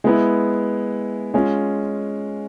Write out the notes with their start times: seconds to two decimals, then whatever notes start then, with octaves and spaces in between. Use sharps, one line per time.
0.04 G#3 B3 E4
1.34 G#3 C#4 F4